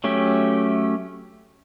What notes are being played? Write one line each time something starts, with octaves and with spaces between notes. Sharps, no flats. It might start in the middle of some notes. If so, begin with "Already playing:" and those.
F#3 A3 C#4 G4